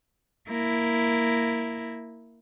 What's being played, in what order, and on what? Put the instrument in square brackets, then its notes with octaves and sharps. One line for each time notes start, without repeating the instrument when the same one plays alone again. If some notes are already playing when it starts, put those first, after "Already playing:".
[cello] A#3 E4